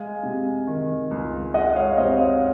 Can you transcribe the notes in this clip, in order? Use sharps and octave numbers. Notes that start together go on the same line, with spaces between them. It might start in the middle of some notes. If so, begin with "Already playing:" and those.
Already playing: G#3 F5 G#5
C3
D#3
C#2
G#3 D#5 F#5
C#5 F5
C3 C5 D#5
C#5 F5